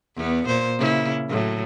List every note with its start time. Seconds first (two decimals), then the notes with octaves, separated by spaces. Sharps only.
0.16 E2 B3
0.47 A#2 C5
0.78 C#3 A#3 E4
1.29 A2 F#3